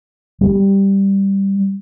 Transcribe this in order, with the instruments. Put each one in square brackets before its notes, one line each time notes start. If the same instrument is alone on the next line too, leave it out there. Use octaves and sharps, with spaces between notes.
[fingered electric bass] G3